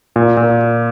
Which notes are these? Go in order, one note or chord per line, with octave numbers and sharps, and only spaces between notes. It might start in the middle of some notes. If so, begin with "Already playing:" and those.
A#2
A#2